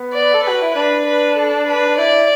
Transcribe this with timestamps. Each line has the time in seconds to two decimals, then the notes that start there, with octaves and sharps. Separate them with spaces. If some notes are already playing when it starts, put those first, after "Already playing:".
Already playing: B3
0.14 D5
0.34 A4
0.45 F#4 B4
0.61 E4
0.75 D4 B4
1.06 B4
1.36 A4
1.68 B4
1.89 D4
1.98 E4 D5